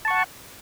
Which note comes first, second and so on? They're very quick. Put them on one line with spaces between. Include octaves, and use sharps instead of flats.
A5 C#6 F#5